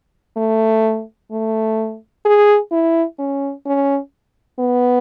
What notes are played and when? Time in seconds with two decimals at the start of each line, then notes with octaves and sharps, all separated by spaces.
0.37 A3
1.31 A3
2.25 G#4
2.72 E4
3.19 C#4
3.66 C#4
4.59 B3